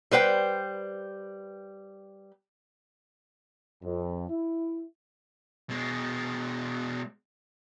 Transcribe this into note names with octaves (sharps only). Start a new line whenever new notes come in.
G3 B4 C5 G5
F2
E4
B2 G#3